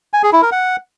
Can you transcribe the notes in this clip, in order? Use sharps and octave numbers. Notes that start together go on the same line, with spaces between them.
G#5
G#4
E4
A#4
F#5